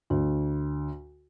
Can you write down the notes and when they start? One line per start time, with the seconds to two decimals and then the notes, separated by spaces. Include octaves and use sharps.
0.10 D2